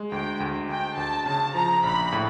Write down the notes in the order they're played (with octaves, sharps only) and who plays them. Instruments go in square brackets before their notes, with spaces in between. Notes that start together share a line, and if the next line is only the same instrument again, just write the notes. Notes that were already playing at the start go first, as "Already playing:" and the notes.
Already playing: [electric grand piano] G#3
[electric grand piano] D2 [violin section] G5
[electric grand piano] D2
[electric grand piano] D2 [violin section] G5
[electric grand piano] D2 [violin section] A5
[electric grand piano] C#3 [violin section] A5
[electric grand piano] F3 [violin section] A#5
[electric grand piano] A#1 [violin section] B5
[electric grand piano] A2